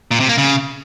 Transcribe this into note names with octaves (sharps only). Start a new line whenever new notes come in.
A#2
C3
A#3
C#3